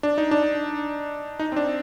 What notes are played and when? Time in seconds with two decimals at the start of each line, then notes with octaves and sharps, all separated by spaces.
0.03 D4
0.18 D#4
0.31 D4
1.39 D#4
1.52 C4
1.56 D4